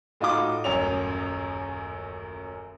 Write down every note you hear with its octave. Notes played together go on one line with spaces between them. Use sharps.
A2 D#4 F4 F#4 D6
D#1 A1 F#2 C#5 F7